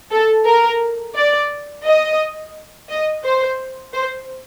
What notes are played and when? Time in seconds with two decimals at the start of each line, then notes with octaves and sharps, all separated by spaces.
0.11 A4
0.45 A#4
1.15 D5
1.84 D#5
2.89 D#5
3.24 C5
3.93 C5